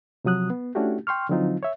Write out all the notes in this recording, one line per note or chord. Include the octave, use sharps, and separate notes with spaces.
C3 F3 F#3 D#6 F#6
B3
A3 C#4 D4 E4 F#4 G4
G5 C6 C#6 F6
D3 F3 F#3 C4 D#4 F4
C#5 E5